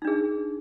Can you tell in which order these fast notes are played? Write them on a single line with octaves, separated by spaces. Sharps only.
D#4 D4 G#4